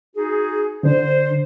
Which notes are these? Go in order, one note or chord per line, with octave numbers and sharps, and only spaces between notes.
D#4 F#4 G#4
D3 D4 C5